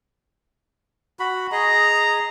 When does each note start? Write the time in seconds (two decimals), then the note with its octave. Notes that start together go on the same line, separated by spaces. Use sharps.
1.19 F#4 B5
1.52 G#4 D#5 A#5